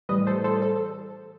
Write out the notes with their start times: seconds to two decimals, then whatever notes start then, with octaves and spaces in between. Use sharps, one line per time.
0.09 A2 E3 G3 B4 D#5
0.27 A4 C5
0.44 A4 C5
0.62 A4 C5